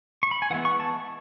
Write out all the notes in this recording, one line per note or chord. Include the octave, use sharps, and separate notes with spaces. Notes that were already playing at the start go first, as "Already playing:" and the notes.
C#6
B5
G#5
E3 G#3 B3 F#5
C#6
A5